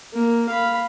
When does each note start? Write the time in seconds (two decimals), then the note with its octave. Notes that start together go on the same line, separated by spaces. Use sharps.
0.13 A#3
0.49 F5 B5